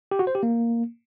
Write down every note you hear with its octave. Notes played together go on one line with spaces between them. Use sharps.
G4
F#4
C5
G4
A#3